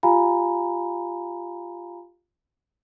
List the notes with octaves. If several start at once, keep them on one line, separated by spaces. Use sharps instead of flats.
F4 G4 F5 G#5 A#5 B5